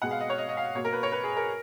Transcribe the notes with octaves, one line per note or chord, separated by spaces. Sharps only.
B2 G#3 B3 F#5
F5
D#5
C#5
D#5
D#5
F5
B2 F#3 A#3 C#5
A#4
B4
C#5
B4
G#4
A#4